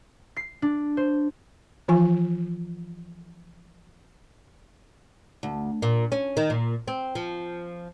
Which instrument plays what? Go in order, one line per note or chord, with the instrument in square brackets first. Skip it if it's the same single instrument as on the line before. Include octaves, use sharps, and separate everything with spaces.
[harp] C7
D4
C5
[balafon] E3 F3 F4 G#5
[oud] D2
A#2
C#4
D#3
A#2
C4
F3